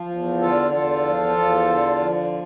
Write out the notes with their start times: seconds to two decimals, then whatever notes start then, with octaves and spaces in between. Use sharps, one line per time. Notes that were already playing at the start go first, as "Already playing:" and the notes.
Already playing: F3
0.09 E2
0.40 D3 F4 A4
0.73 E2 F4 A4
1.05 F3
1.37 E2
1.69 D3
2.01 F3